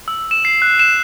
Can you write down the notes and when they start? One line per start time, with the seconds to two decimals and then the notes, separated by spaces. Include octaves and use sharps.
0.08 E6
0.31 E7
0.45 C7
0.62 F#6
0.79 E7